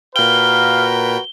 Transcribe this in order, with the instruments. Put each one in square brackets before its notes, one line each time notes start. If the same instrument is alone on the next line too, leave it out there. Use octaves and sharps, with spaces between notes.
[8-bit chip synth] A#2 G5 [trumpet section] F#4 A#4 B4 [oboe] F5 [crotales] G7